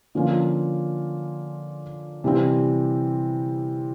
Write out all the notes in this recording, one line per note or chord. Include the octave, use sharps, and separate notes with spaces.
D3 F3 A#3 C#4 F4
C3 E3 G3 C4